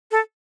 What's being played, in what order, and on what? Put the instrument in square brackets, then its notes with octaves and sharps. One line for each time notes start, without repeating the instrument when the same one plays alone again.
[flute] A4